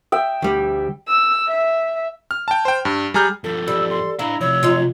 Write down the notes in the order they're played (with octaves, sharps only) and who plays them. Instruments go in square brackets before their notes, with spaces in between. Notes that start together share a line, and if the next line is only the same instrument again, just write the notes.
[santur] E5 G5
[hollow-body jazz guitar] D2 G3
[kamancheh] E6
E5
[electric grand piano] F6
G5 A5
C5 G5
G2
G3 G#4 A#5 F6 G6
[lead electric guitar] G2 F3 [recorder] A4
[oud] G3 [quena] E6
[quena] C6
[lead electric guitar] D4 F5 [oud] E4 [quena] A#5
[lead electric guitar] C3 F3 [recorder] C#5 [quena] E6
[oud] F#2 D#4 F4